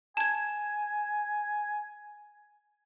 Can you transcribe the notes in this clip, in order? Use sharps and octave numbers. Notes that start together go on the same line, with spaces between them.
G#5 A5 G#6